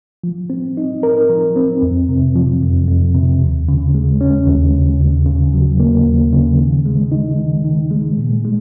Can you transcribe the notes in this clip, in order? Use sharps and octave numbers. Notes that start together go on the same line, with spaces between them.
F3
C4
D#4
A#4
F3
C4
F2
C3
F3
F2
F2
C3
D#2
C#3
G#3
C#4
D#2
C#3
D#2
C#3
F#3
A#3
D#2
C#3
D#3
G#3
D#4
D#3
D#3
G#3
A#2
G#3